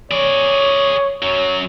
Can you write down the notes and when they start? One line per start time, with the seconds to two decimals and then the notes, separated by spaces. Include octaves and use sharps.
0.11 G#4 C#5 D5
1.23 F#2 F#3 C#5